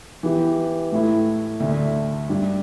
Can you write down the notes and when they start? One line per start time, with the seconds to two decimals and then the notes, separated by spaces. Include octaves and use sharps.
0.23 E3 B3 G4
0.92 A2 A3 E4
1.60 D2 D3 A3
2.29 G2 G3 D4